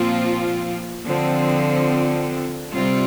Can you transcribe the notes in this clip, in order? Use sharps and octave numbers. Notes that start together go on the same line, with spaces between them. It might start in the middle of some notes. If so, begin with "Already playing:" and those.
Already playing: A#2 F3 C4 F4
D3 F3 C4
C3 G3 C4 F4